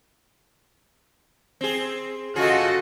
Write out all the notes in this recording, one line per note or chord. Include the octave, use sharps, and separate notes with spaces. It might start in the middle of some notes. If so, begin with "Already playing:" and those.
C4 G#4
C#3 F4 F#4 G#4 A4 D#5